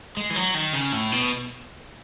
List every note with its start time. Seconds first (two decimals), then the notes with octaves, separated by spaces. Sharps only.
0.17 G#3
0.30 E3
0.36 F#3
0.54 D#3
0.73 C#3
0.92 A2
1.12 B2